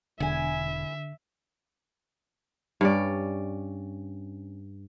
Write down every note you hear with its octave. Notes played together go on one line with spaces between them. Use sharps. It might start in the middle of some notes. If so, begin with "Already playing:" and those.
E1 D3 E4 E5 G#5
G2 C#4 D5